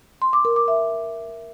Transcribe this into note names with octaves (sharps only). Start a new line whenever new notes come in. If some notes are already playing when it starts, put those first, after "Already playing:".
C6
D6
A#4
D6
E5